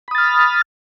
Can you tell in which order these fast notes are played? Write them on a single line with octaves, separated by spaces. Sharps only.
B5 D#6 A6 F6